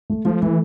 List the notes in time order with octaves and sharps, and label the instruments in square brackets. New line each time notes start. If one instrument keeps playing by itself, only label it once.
[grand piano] A3
[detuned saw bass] F3 [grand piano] A3
[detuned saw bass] E3 [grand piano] A3